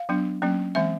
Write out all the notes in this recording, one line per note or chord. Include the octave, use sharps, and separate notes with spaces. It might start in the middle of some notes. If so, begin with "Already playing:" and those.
Already playing: F5
F#3 B3 D4
F#3 A#3 C#4
E3 G#3 C4 E5